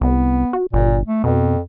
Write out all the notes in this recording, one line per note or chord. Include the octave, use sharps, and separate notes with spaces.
C2 B3
F#4
G1 A#2
A3
F2 B2